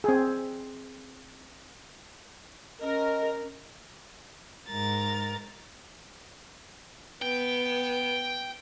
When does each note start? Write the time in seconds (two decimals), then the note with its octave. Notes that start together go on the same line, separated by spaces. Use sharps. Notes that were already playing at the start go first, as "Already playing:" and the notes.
0.04 C4 G#4
2.81 C#4 A#4 D#5
4.67 G#2 A#4 A6
7.22 B3 G5